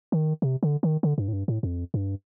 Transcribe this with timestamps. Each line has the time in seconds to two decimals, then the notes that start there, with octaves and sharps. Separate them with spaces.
0.12 D#3
0.42 C3
0.63 D3
0.83 D#3
1.03 D3
1.18 G2
1.28 A2
1.33 G2
1.48 A2
1.63 F2
1.94 G2